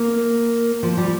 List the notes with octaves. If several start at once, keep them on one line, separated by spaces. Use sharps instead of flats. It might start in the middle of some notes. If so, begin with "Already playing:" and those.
Already playing: A#3
F3
G3